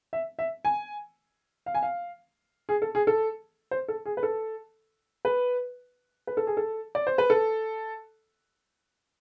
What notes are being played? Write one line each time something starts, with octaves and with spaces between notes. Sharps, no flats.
E5
E5
G#5
F5
G#5
F5
G#4
A4
G#4
A4
C5
A4
G#4
B4
A4
B4
B4
A4
G#4
A4
D5
C5
B4
A4